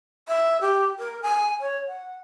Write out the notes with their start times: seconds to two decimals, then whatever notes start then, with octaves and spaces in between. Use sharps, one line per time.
0.28 E5
0.61 G4
0.99 A#4
1.22 G#5
1.61 C#5
1.88 F#5